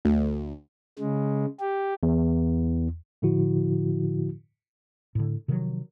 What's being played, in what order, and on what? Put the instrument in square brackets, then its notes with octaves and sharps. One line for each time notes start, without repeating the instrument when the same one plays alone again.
[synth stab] D2
[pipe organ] C#3 G#3
G4
[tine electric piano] E2
A2 D3 F3 E4 F#4
[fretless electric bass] A2 D3
C3 D#3 F3 F#3